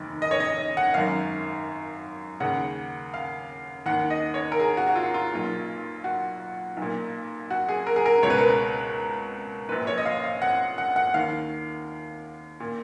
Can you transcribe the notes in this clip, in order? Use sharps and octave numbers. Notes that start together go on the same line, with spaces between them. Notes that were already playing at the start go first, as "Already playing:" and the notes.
Already playing: F1 D#2 D#3
D#5
C#5
D#5
D#5
F#5
G#1 F#2 D#3 F5
D#2 C#3 F#5
F5
D#2 D#3 F#5
D#5
C#5
A#4
G#4
F#4
F#4
F4
F4
B1 A#2
F#4
B1 A#2
F#4
G#4
A#4
G#4
A#4
C#2 B2 B4 C#5
A#4
B4
A#1 A#2 B4
C#5
D#5
F5
F5
F#5
F#5
F#5
D#2 D#3 F5
A#2